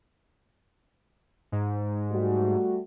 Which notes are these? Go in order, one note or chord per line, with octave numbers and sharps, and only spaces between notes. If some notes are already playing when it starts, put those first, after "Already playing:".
G#2
G3 A3 F#4